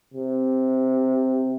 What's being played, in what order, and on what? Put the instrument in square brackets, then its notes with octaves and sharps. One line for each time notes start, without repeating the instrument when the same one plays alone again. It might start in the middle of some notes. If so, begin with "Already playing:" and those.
[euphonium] C3